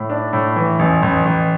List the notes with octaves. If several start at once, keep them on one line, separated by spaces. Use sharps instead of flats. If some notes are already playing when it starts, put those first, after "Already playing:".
Already playing: A2
D4
A2
E3
A1
A1
A1